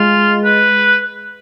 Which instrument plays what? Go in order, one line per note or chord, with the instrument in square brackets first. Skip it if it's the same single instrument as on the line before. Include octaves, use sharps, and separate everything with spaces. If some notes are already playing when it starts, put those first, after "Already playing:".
Already playing: [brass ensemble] G#3 [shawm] F4
[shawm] B4